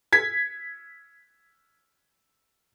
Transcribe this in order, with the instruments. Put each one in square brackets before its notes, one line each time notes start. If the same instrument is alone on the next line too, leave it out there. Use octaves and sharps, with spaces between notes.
[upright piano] G#6 B6